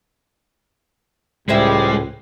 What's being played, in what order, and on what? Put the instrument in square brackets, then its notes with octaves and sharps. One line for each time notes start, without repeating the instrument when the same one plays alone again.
[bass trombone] C#2 [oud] A2 C5 E5 [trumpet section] G3 [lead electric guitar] G#3